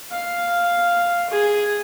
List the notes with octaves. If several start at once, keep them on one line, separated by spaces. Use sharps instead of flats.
F5
G#4